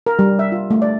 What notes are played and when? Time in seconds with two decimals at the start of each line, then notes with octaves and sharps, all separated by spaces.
0.06 A#4
0.19 G3
0.39 E5
0.52 F4
0.70 A3
0.82 D5